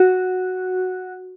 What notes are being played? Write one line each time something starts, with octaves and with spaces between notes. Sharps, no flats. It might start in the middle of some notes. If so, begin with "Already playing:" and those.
Already playing: F#4